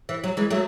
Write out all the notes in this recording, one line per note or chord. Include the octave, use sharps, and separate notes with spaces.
E3
F#3
E3 G#3
F#3 A3